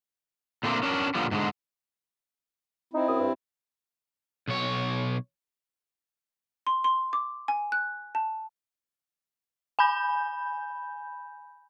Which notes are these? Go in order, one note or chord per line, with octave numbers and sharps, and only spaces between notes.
A#2 D3 A3 A#3 C4 D4
C#4 D4 A#4
A#2 D3 F3 G3 B3
G#2 D3 G#3
C4 D#4 E4
F#2 D#6
G2
B1 C#5
C6
C6
D6
G#5
F#6
A5
G#5 B5 G6